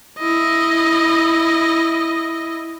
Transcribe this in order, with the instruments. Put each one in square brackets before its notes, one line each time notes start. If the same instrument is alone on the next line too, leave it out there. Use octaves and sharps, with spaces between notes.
[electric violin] E4 D#5